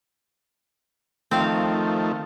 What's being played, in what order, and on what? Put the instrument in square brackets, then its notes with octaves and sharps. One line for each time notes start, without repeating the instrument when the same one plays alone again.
[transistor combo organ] D#3 F3 A3 [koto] C4 F5